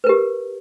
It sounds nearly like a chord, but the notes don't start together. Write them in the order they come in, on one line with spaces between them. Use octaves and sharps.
B4 A#4 G4